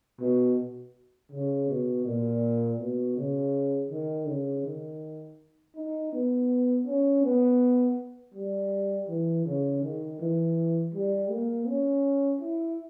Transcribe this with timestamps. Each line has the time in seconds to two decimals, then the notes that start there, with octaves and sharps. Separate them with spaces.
0.21 B2
1.32 C#3
1.69 B2
2.06 A#2
2.80 B2
3.17 C#3
3.91 D#3
4.28 C#3
4.65 D#3
5.76 D#4
6.13 B3
6.87 C#4
7.24 B3
8.35 G3
9.09 E3
9.46 C#3
9.83 D#3
10.20 E3
10.94 G3
11.31 A#3
11.68 C#4
12.41 E4